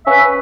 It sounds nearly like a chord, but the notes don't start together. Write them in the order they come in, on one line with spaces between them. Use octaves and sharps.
C#4 E5 B4